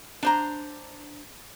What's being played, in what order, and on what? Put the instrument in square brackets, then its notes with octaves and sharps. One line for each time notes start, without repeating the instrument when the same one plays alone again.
[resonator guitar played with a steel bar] D4 C5 A#5